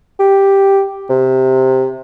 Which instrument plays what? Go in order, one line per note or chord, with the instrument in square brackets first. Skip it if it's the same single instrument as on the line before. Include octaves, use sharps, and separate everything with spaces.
[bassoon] G4
C3